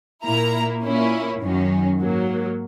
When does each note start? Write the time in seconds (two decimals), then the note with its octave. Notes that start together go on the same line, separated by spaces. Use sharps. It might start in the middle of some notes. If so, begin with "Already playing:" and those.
0.25 A#2 A#3 E4 A#5
0.83 A#2 A#3 C#4 E4
1.40 F#2 D#3 F#3 C#4
1.99 G#2 F#3 A#3